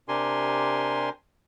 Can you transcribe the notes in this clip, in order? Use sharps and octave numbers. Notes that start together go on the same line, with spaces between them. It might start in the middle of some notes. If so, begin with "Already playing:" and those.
C3 D4 G4 A#4 G#5 C6